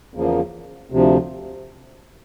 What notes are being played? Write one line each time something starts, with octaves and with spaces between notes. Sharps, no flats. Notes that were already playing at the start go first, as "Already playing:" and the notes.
E2 C#3 F3 A#3
D2 C3 F3